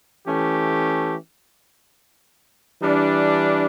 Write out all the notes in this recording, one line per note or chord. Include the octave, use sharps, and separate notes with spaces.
E3 A3 C#4 G4
E3 G3 D4